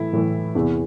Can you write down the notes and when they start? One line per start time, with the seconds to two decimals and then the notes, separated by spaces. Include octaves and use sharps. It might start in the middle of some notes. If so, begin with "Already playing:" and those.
Already playing: A2 E3 E4
0.13 A2 E3
0.55 E2 C3 E3